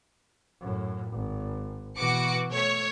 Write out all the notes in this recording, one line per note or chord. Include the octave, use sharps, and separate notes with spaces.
F#2 A2
G#1
B2 E3 F#4 D6 C#7
A3 C#5